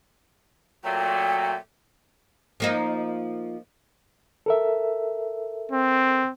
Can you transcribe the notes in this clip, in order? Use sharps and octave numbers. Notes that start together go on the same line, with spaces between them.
A#2 F#3 A3 G5
F3 A#3 D#4
A4 A#4 E5
C4